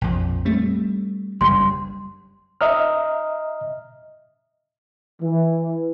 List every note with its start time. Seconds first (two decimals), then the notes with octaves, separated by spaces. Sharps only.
0.01 A#1 F2
0.45 G3 A3 C4
1.41 F#1 G2 G3 C6
2.61 D#5 E5 A#5 F6
5.22 E3